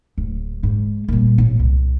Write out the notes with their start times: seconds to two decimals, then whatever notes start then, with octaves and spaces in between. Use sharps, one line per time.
0.18 D1
0.63 G#2
1.08 A#2 G3
1.38 A1
1.59 C2